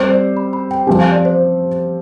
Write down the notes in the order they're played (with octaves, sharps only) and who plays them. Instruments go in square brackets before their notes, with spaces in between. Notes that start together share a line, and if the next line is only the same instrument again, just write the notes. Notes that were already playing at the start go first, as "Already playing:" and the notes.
Already playing: [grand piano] G3 C4 G4 C5
[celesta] D5
B5
B5
G5
[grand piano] F3 C4 G4 [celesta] G#5
[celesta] F5
D5
C5